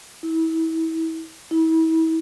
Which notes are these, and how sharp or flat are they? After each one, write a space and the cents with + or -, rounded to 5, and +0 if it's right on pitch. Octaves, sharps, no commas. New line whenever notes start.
E4 -30
E4 -35